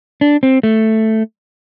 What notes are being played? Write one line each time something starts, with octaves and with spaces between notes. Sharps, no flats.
D4
C4
A3